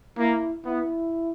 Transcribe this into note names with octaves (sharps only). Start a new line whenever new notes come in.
A#3 E4
B3 E4